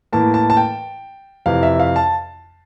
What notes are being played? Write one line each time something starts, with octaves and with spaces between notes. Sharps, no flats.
A2 E3 A#3 A5
A5
A5
G5
F2 C3 E3 F5
E5
F5
A5